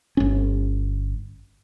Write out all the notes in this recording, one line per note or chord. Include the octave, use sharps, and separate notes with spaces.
G1 C#4